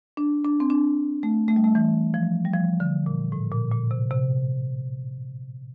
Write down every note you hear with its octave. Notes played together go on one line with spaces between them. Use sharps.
D4
D4
C4
D4
A3
A3
G3
A3
E3
F3
G3
F3
D3
A#2
A2
A#2
A#2
C3
C3